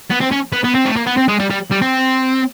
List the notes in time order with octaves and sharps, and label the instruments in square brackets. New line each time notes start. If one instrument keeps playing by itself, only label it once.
[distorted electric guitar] B3
C4
C#4
B3
B3
C4
A3
A#3
B3
C4
G#3
G3
G3
G3
C4